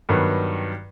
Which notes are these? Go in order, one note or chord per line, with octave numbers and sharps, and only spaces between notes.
G2 D#3 F#3 B3